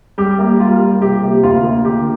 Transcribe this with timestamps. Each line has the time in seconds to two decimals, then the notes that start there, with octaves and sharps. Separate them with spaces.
0.18 G3 G4
0.39 A#3
0.60 G3 F4
0.80 G3
1.01 C3 G4
1.22 A#3
1.43 D2 F4
1.64 A#3
1.85 D3 G4